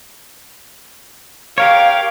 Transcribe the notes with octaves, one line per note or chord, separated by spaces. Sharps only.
G4 A#4 C#5 F5